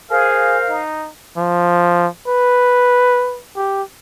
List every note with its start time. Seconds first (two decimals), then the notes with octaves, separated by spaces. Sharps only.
0.11 G#4 A#4 C5 F5
0.69 D#4
1.36 F3
2.27 B4
3.56 G4